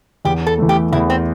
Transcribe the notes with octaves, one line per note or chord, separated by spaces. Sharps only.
E2 G4
A4
E3 A3
G4
E2 E4
C4